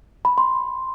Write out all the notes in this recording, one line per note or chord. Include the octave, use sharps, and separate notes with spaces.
B5
C6